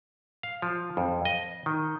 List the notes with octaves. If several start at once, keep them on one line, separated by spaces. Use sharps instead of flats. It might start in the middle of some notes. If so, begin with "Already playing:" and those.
F5
F3
F2
D#5
D#3